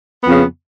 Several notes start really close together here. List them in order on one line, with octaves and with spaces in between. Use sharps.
B3 F2 C#3